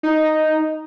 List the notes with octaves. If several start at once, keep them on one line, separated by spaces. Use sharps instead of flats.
D#4